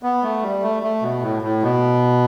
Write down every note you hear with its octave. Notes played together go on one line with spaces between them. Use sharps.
B3
A3
G3
A3
A3
B2
A2
A2
B2